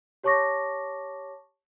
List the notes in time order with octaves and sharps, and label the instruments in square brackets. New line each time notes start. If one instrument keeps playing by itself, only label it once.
[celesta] G4 C#5 A5 C#6 D6 A#6